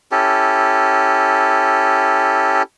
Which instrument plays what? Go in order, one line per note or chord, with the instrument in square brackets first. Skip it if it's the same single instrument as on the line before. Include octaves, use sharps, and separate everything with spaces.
[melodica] C#4 E4 G4 A4